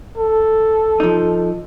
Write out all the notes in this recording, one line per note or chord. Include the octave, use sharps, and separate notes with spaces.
A4
F3 D#4